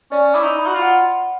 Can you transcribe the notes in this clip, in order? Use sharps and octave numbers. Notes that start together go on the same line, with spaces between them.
C#4 D5
E4 D6
D#4
B5
F#4
F4
F#5